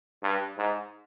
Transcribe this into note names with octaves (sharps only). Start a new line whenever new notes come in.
G2
G#2